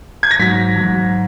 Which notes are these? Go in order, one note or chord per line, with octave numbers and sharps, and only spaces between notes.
G#6
A#6
G#2 F#3 B6
G#2 F#3